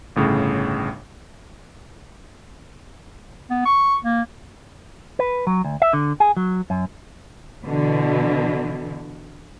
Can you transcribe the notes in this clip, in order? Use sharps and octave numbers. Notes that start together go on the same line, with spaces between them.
G1 A2 C#3
B3
C#6
A#3
B4
F#3
D2
E5
D3
G#4
F#3
F#2
B2 D3 E3